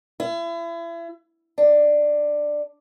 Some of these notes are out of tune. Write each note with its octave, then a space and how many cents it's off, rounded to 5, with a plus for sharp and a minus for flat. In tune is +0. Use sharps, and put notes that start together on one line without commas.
E4 +35
D4 +10